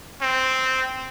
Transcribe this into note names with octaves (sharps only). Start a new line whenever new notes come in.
C4